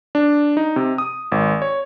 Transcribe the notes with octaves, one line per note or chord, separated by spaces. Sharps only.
D4
D#4
C3
D#6
G#1
C#5